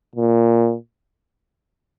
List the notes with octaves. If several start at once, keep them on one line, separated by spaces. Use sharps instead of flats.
A#2